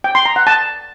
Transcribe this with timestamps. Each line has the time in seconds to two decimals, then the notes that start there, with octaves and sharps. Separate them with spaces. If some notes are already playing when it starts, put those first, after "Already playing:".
0.04 G5
0.15 C6
0.26 A#5
0.36 F#5
0.47 A5